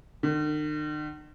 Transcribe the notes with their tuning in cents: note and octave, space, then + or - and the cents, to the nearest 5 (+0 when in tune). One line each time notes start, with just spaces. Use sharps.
D#3 -45